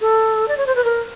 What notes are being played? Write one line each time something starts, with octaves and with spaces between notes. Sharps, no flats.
A4
D5
C#5
C5
B4
A#4